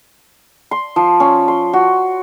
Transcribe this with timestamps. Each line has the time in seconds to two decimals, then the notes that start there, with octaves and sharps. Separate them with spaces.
0.71 C6
0.96 F3
1.20 C#4
1.48 C6
1.73 F#4